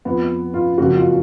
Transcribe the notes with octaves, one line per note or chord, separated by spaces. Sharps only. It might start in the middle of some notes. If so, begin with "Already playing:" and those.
F2 F3 B3
F4
F#1 F2 C#3 F3 F#4
F4